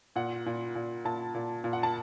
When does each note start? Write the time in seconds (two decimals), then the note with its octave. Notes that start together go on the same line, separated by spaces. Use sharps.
0.16 A#2 F#5
0.46 A#2
0.75 A#2
1.05 A#2 A5
1.35 A#2
1.64 A#2
1.73 F#5
1.83 A5